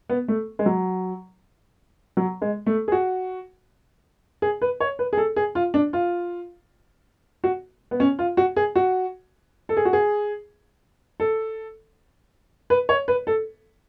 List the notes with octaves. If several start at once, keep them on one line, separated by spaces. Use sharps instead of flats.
B3
A3
G#3
F#3
F#3
G#3
A3
G#4
F#4
G#4
B4
C#5
B4
G#4
A4
G#4
F4
D4
F4
F#4
B3
C#4
F4
F#4
G#4
F#4
A4
G#4
F#4
G#4
A4
B4
C#5
B4
A4